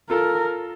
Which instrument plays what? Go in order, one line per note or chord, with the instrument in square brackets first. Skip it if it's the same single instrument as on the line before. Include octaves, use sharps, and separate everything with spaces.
[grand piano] F4 A4 [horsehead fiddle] A#4